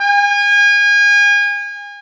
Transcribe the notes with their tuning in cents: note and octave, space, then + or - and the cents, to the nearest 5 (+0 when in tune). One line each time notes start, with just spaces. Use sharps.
G#5 -35